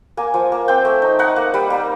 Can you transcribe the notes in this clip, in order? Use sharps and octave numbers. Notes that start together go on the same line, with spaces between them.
A#3 G#5
F3
A#3
C4 G5
A3
D#4
D#4 F#5
A#3
G3
A#3